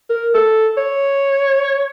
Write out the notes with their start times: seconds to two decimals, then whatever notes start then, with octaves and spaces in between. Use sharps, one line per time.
0.10 A#4
0.34 A4
0.77 C#5